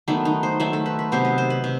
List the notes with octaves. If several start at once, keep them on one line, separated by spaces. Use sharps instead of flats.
D#3 F#3 A3 B3
D#4
C5
D#3 F#3 A3 E5
A4
B4
B4
C3 F#3 B3 C5
D#5
C5
B4
C3